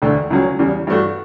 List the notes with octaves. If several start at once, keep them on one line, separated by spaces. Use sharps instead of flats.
E1 D2 D3 A3
C#2 C#3 F#3 C#4
E2 C#3 G3
G2 E3 A3 D4 F#4